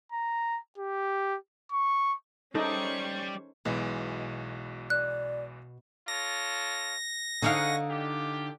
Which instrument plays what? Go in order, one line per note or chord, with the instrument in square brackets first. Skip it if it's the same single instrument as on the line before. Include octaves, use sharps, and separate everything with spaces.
[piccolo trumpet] A#5
G4
C#6
[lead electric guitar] G3 D5 [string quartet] C#4 C5 C#6 [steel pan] D#4 A4
[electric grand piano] B1 E3 G#3 [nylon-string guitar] B2
[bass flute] D5 [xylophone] F#6
[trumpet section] F4 A4 C#5 [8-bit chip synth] A#6
[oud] D3 D#4 F5 [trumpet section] G#4 F#5 C#6
[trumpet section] F4 G4